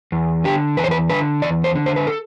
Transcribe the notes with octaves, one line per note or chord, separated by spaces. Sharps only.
E2
D3 G4
E2 B4
C5
B4
D3 B4
E2 D5
C5
D3
C5
B4
A4